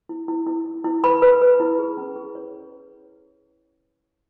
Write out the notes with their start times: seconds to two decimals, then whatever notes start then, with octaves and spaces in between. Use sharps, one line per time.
0.09 E4
0.28 E4
0.47 E4
0.66 E4
0.84 E4
1.04 B4 B5
1.22 B4
1.41 B4
1.60 E4
1.79 G#4
1.97 C#4
2.16 G#4
2.35 C#5